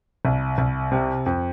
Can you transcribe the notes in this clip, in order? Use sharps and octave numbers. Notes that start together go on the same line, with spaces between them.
C2
C2
C3
F2